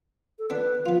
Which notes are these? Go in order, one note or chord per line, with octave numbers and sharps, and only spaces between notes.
A4
B3 D4 B4
F3 B3 F4